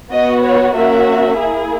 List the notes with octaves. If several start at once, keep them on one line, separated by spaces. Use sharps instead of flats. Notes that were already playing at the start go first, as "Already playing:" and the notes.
B3 F#4 D#5
C#5
A#3 C#4 F#4 E5
A#3 E4 G#4